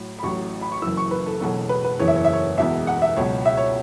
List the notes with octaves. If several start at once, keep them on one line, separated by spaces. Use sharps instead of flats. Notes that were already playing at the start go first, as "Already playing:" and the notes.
Already playing: A2 F#3
B5
A1 A2 F#3 C#6
B5
C#6
F#1 F#2 E3 E6
C#6
B4
A4
E1 E2 B2 F#3 A4
B4
B4
F#1 E2 E3 C#5
E5
C#5
E5
C#5
E1 E2 B2 E5
F#5
E5
C#2 B2 F#3 C#5
E5
C#5